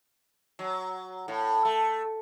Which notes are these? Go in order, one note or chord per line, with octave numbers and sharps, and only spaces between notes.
F#3
A2
A3